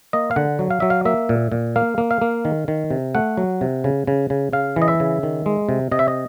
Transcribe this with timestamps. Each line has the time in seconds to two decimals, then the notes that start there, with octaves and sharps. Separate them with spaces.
0.13 A#3 D#5
0.31 F5
0.36 D3 F#5
0.59 F#3
0.71 F5
0.80 F#3 E5
0.90 F5
1.05 A#3 E5
1.29 A#2
1.52 A#2
1.76 A#3 F5
1.98 A#3
2.11 F5
2.21 A#3
2.45 D#3
2.68 D#3
2.91 C3
3.15 A3 F#5
3.37 F#3
3.61 C3
3.84 C#3
4.07 C#3
4.30 C#3
4.53 C#3 F5
4.76 E3
4.82 D#5
4.88 E5
5.00 C#3
5.23 D#3
5.46 G#3
5.69 C3
5.92 C3 D#5
5.99 E5
6.08 D#5